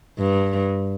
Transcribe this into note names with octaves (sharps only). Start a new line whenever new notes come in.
G2